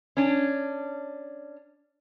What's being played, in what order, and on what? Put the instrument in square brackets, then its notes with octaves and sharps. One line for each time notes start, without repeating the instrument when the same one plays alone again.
[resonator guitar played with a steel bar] C#4 D4